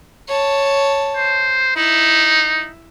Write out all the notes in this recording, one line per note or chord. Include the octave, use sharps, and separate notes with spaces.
C#5 A5
C5
D#4 E4